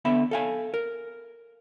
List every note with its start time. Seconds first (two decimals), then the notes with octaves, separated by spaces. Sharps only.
0.05 D3 B3 E5 B5
0.31 A4 F5 G#5
0.74 A#4